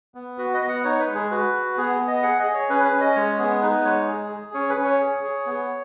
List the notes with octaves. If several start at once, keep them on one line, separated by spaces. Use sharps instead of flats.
B3
F#4 B4
D#5
B3
F#5
D#4 C#5
B4
G#3
G#4
F#4 B4
F#4
B3 G#4
B3
D#5
G#4 F#5
D#5
G#4
C#5
C#4 B4
B4
C#4
D#5
G#3 C#5
B3 G#4
D#4 B4
G#3 C#5
G#4
G#4
C#4 C#5
B4
C#4
C#5
G#4
G#4
B3